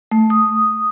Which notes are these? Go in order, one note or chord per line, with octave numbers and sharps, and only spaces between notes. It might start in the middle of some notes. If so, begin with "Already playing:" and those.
A3
D#6